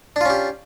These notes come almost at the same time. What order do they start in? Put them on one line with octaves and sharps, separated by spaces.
D4 F4 C#4 G4